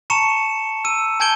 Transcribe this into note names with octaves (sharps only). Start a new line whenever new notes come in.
A5 A#5 C#6 C#7 E7
E6 D#7
G#5 A5 G6 G#6 D7 G7